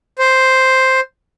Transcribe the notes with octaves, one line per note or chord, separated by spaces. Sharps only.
C5